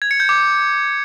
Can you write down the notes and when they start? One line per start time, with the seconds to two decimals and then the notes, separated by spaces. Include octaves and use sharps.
0.02 G#6
0.11 C#7
0.20 G6
0.29 D6